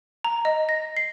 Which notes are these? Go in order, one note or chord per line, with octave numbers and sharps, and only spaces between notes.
A#5
D#5
A#6
C7